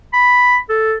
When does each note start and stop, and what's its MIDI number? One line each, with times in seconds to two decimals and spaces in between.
0.14 0.57 83
0.69 0.96 69